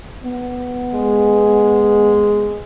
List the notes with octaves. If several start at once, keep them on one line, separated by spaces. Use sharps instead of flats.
B3
G#3